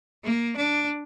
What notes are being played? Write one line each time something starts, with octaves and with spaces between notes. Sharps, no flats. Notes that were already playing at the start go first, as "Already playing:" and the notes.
A#3
D4